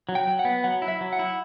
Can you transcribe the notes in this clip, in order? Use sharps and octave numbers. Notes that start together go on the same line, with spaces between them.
F#3
G5
F#3
F#5
B3
F#3 F#5
E4
E5
F#3
F#5
E4